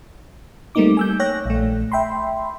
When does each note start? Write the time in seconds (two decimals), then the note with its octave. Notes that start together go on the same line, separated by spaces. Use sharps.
0.75 G3 A3 A#3 C4 D#4 D6
0.97 G#5 E6 G6
1.20 C#5 G5 F#6 A#6
1.45 A#1 A3
1.92 E5 G5 B5 C6